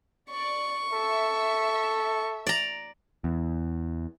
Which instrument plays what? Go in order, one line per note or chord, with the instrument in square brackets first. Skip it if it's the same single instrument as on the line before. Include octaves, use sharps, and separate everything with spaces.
[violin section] D5 [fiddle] C#6
[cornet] A4 [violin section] E5
[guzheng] D5 A#5
[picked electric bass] E2